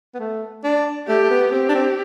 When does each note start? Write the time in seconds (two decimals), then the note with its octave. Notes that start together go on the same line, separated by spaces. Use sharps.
0.14 B3
0.19 A3
0.64 D4
1.08 A3 G4
1.23 A3
1.30 B3
1.52 C4 G4
1.69 D4
1.75 C4